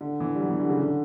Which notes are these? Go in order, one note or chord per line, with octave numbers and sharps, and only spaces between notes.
D3
E3
G3
F#3
E3
D3
C#3
D3